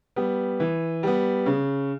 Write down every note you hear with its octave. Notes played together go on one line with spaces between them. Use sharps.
G3 B3
E3
G3 B3
C#3